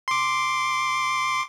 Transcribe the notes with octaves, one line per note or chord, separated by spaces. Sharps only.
C6 D6